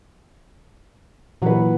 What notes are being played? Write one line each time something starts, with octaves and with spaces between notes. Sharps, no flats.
A#2 E3 F#3 B4 F#5